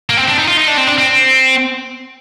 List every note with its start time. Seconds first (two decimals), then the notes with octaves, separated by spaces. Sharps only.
0.10 A#3
0.17 C4
0.28 D4
0.38 D#4
0.48 F4
0.57 D#4
0.68 D4
0.78 C4
0.87 D4
0.98 C4